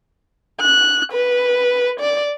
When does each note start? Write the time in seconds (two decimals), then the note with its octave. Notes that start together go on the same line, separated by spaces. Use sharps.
0.61 F#6
1.12 B4
2.00 D5